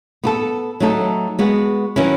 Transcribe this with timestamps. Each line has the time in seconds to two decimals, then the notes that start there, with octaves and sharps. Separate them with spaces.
0.24 B3 F#4 A4
0.80 F#3 A3 D#4 A4
1.39 G#3 B3 F#4
1.96 D#3 F#3 C#4 E4 B4